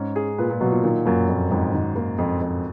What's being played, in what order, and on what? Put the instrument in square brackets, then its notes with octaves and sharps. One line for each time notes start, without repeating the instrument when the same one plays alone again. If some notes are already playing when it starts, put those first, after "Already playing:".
Already playing: [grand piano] G#2 [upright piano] C#4
[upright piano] G#4
[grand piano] A#2 [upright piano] B4
[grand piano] A#2
[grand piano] B2 [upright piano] F#3
[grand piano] A#2
[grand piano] A#2 [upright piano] D#3
[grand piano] F#2 [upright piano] A#3
[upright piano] F2 [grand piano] A#2
[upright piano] F2 [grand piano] G#2
[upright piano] D#3
A#3
F2
F2